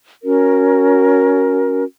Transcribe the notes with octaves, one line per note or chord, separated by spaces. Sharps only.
C#4 F#4 A#4